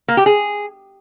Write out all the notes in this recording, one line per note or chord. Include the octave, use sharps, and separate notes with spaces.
A#3
G4
G#4